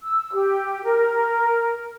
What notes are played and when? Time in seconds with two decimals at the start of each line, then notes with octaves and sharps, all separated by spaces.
0.01 E6
0.33 G4
0.83 A#4